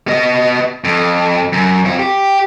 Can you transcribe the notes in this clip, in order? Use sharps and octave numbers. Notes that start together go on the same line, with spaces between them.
B3 D#5
F2
F#2
C4 F4
G4